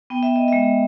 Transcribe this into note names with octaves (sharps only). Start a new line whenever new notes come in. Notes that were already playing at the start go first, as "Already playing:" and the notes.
B3 G5
E5
D#5
G#3 E5